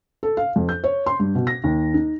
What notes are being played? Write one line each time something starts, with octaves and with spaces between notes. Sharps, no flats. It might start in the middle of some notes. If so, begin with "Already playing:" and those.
A4
F5
F2
G6
C#5
C6
G2
B2
A#6
D#2
D#4